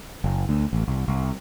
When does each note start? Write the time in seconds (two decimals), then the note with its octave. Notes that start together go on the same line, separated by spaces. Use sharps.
0.24 F#1
0.49 D2
0.73 A1
0.88 C2
1.08 C2